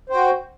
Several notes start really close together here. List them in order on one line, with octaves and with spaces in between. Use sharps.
C5 G5 F#4